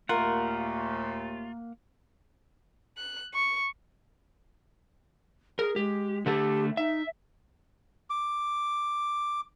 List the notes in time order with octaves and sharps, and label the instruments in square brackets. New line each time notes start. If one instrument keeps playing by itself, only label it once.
[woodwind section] D#2 A#2 A3 [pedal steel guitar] A#3 F#5 [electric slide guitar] F4 [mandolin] A#4
[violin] F#6
C#6
[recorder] G#4 [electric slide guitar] A#4
[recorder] G#3 [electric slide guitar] G4
[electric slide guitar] D3 A3 A4 [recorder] G4
[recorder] D#4 [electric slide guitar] E5
[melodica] D6